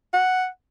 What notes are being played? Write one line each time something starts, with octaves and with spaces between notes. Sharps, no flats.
F#5